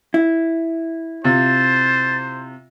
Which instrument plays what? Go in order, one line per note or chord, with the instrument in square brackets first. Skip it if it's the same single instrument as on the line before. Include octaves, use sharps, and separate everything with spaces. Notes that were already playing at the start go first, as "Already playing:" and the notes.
[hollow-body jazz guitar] E4
[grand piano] C3 F4 [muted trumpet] C5 [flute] A6